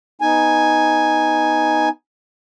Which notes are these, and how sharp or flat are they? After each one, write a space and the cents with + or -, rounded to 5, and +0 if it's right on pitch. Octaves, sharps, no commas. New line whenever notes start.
B3 +0 D#4 +5 G#5 +0